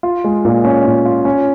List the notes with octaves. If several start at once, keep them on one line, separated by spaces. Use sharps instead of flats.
F4
G#3
A#2
C#4
A#2
F4
C#4